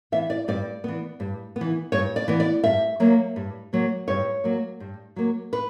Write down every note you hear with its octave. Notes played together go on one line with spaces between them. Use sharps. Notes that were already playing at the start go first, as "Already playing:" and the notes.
E3 B3 E5
D5
G2 D5
E3 B3
G2
B3
E3
G2 C#5
D5
E3 B3
D5
G2 E5
F#3 A#3
G2
F#3 A#3
G2 C#5
F#3 A#3
G2
F#3 A#3
B4